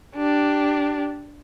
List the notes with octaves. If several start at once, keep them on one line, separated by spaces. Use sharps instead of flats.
D4 G4